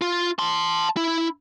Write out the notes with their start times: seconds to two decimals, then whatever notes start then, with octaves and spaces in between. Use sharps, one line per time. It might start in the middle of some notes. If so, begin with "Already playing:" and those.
0.02 F4
0.39 A5 C6
0.97 E4